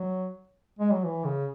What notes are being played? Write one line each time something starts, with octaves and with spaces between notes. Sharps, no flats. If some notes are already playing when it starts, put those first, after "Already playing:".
Already playing: F#3
G#3
F#3
E3
C#3